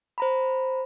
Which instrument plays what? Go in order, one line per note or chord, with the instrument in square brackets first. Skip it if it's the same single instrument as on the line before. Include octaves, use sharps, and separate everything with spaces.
[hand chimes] C5 A#5 B5